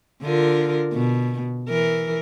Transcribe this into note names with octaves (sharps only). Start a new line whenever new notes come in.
D3 F4 A#4
B2
E3 A#4